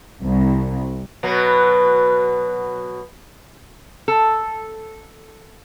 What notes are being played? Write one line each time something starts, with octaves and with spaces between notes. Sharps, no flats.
C2
B2 F#3 B3
A4